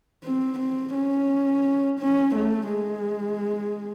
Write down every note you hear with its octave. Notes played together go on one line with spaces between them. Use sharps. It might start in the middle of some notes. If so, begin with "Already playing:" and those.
C4
C4
C#4
C#4
A3
G#3